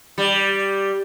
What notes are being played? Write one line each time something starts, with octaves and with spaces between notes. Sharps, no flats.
G3